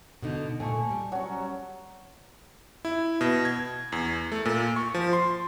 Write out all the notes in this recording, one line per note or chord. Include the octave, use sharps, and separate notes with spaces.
B2 D3 D#4
A#2 A3 G#5 A5 C#6
G3
F#3 C#4
E4
B2
G#6
E2
A3
A#2
C#6
F3
C6